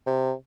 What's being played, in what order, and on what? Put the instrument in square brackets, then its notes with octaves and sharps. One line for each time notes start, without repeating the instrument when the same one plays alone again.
[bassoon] C3